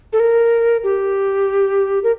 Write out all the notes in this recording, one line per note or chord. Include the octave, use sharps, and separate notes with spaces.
A4
A#4
G4
A#4